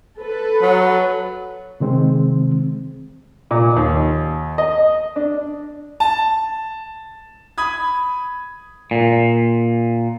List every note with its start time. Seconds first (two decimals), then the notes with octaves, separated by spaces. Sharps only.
0.18 A4 B4
0.62 F#3
1.80 C3 D#3 G#3 C4
3.51 A#2
3.77 D#2
4.58 D#5
5.16 D4
6.00 A5
7.58 B5 D#6 G#6
8.91 A#2